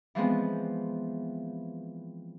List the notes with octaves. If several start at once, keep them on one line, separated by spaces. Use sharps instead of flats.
E3 F3 G#3 B3 C4